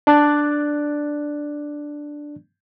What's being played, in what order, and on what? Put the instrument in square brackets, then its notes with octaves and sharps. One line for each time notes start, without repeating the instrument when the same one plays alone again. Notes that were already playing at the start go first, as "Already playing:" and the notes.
[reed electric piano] D4 D5 F#6 A6